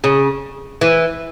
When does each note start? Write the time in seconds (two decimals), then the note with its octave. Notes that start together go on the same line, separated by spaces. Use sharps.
0.04 C#3
0.81 E3